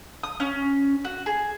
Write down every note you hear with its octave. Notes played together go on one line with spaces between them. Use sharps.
D#6
C#4
F#4
G#4